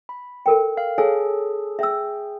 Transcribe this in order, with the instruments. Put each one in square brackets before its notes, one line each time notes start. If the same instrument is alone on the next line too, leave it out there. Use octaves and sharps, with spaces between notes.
[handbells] B5
[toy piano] A4 A#4 G5
[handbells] F5
[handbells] G#4 A4 [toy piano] C#5 G#5
[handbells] G#4 G5 [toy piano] E5 E6